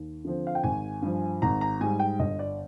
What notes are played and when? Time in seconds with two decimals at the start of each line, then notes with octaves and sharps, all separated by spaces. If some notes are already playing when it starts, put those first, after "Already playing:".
Already playing: D#2
0.25 D3 F3 C4
0.47 F5
0.55 G5
0.64 G#1 G#5
1.02 G2 F3
1.42 G#1 A#5
1.61 A#5
1.81 G#2 G3 G#5
2.00 G5
2.19 G1 D#5
2.39 D5